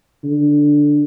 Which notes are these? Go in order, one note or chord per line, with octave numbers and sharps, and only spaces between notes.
D3